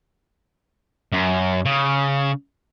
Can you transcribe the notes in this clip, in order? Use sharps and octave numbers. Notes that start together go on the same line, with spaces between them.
F#2
C#3